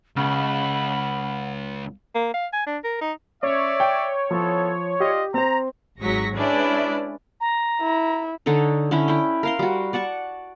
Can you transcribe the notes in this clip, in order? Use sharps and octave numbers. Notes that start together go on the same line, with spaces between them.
C#2 C#3 F#5 B5
A#3
F5
G#5
D4
A#4
D#4
C#4 C#5 D5 E5
G5
F3 B3 E4 A4
F4 G4 D5 D#5
C4 C5 A#5
G#1 F#3 G#3 C#6 A#6 B6
G#3 C#4 D4 E4 B4 D5
A#5
E4
D3 D#4 A4 C#5
D3 C#4 E4
E4 G5
A#4 F5 C6
G3 F#4
D5 F#5 A5 C#6